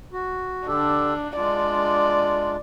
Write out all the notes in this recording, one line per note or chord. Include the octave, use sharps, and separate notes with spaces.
F#4
D3 D4 G4 A4
G#3 D4 F4 D5